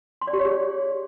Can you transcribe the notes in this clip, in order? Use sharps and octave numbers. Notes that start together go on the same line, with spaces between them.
C6
D5
G4
C#5
G#4